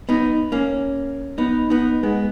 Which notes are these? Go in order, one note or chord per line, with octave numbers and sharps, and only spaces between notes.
B3 D#4
A#3 C#4
B3 D#4
B3 D#4
G#3 B3